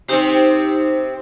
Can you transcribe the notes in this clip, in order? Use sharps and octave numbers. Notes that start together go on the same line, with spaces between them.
C3 C4 D#4 G4 C5